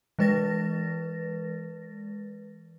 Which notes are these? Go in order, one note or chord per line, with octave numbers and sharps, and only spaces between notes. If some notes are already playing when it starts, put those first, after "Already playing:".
E3 G#3 B4 A6 A#6